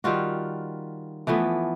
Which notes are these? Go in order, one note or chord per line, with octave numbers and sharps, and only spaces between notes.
D#3 G3 F4 F#4
E3 F3 A3 B3